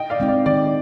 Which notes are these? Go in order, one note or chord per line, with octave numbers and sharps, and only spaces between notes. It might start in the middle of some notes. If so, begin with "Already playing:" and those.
Already playing: D#5 G5
D5 F5
G#3 C4 D#4
D5
D#3 D5